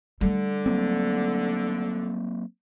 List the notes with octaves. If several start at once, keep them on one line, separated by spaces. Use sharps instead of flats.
D3 G3 A3
F#3 A#3 C4